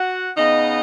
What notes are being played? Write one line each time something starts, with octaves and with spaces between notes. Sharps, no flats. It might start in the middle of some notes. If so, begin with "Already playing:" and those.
Already playing: F#4 F#5
C#3 B3 D#4 D#5